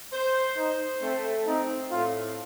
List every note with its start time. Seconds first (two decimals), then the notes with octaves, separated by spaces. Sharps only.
0.13 C5
0.57 D#4 C5
1.02 A3 C4
1.47 C4 D#4
1.91 A2 F4